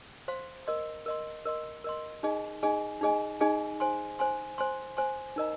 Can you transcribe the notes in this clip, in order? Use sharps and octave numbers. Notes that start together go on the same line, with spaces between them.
C5 F5 C6
A#4 D#5 C6
A#4 D#5 C6
A#4 D#5 C6
A#4 D#5 C6
D#4 G#4 D#5 G#5
D#4 G#4 D#5 G#5
D#4 G#4 D#5 G#5
D#4 G#4 D#5 G#5
C5 G#5 C6
C5 G#5 C6
C5 G#5 C6
C5 G#5 C6
D#4 A#4 D#5 A#5